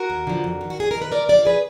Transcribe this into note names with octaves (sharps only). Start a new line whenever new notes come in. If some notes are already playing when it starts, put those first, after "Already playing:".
Already playing: F#4 A#4
D#2
D3 F3
F2
D#3
F#4
F2 G#4
D#3 A#4
B4
D2 A#4 D5
D3 F3 A#4 D5
G#4 B4